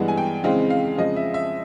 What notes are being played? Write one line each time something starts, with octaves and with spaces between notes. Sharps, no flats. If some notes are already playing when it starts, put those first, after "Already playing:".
Already playing: G2 E3 G#3 B3 F#5
G#5
G5
F2 C#3 E3 G#3 C4 F5
F5
F2 C#3 F3 G#3 D#5
E5
E5